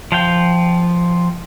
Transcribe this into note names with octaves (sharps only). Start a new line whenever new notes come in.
F3 F5 G5